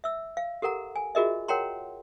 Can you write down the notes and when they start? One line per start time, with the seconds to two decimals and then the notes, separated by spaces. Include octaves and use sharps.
0.04 E5 E6
0.37 F5
0.62 G4 A4 A#4 F#5 A#5
0.96 G#5
1.15 F4 F#4 G#4 A#4 D#5 E5
1.48 A#4 C#5 F#5 G5 A#5 C6